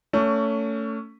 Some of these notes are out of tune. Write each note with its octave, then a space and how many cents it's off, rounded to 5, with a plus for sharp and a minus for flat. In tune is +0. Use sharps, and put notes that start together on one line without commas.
A3 +25 C#4 +25